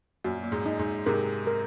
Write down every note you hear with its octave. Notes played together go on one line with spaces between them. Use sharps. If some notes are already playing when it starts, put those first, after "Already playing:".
F#2 A#2 F#4
A#2
G#2
D#4
G#2
G#2 C3 A#4
A#4